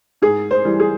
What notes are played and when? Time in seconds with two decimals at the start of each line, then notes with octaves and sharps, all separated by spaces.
0.22 G#2 G#4
0.51 C5
0.65 E3 G3
0.80 G#4